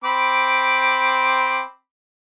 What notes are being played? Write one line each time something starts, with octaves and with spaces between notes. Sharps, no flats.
C4 B5 D6